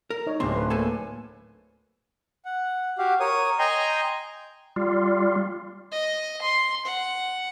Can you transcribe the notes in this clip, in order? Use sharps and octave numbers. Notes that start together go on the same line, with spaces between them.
A#4
D#4 C#5
D1 D3 C4 C6
B4
A3 A#3 A4 G#5 A5
F#5
F#4 G4 F5
A#4 C#5 D#6
D#5 G5 G#5 A#5 C6
G3 F4
D#5
C6
F#5